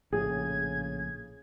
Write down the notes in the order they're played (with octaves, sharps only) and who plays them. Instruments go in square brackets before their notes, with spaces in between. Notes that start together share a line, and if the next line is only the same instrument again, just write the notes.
[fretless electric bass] A#1 A2 [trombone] C#3 [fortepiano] G#4 [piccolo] G#6